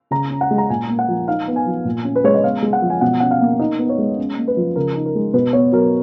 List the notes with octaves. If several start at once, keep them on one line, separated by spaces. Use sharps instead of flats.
C#3 A#5
C#4
F#5
G#3
A#5
A#2 G#5
A#3
F#5
F3
D#4 F5
B3
G#5
F3
A#2
C#4
B4
G#3 C#5
D#5
B3 F5
G#3
F#5
F3
G#5
B2 F#5
C#4 F#5
F5
A#3
D#4 D#5
B3
C#5
G#3
C#4
A#3
B4
F3
C#3 A#4
D#4
A#4
G#3
B2 B4
B3 C#5
F#3 A#4